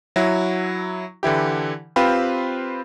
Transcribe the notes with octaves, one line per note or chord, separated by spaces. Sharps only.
F#3 E4 F#4
D3 E3 E4 G4
C4 F4 G4 B4 C5